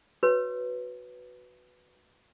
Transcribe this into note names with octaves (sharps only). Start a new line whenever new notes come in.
F#4 B4 C#5